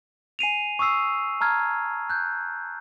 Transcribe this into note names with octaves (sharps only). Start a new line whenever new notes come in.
G#5 C7 D#7 F7
C#6 D#6 E6 C7
A5 A#5 F6 G#6
F#6 G6